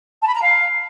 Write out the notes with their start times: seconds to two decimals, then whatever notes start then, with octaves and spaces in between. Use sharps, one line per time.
0.22 A5
0.28 B5
0.35 A#5
0.42 F5